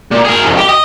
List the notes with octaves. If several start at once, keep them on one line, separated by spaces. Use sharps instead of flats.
A#2
G#4 A#4
C2 F2
G4
D#5